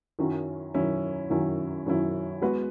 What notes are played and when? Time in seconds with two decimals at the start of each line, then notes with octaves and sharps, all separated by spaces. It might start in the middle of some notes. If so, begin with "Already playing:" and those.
0.19 F#2 D#3 F#3 C#4 E4
0.74 F#2 D#3 F#3 C#4 E4
1.30 F#2 D#3 F#3 C#4 E4
1.86 F#2 D#3 F#3 C#4 E4
2.42 G#3 B3 F#4 B4